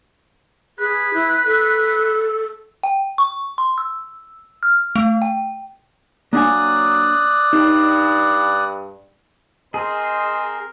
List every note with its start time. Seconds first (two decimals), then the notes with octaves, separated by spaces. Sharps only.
0.79 G#4 B4
1.14 E4
1.46 A4
2.83 G5
3.18 C#6
3.58 C6
3.78 E6
4.63 F6
4.96 A3
5.22 G5
6.33 F#3 A#3 D4 D5 G#5 D#6 F#6
7.53 G2 D#4
9.74 C4 G#4 A#4 C5 D#5